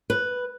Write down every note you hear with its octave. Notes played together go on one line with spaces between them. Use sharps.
B4